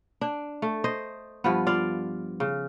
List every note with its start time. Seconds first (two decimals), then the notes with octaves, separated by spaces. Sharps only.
0.21 D4
0.62 A3
0.84 C5 D#5
1.44 G2 F3 B3
1.67 F4 D5 F5
2.40 C#3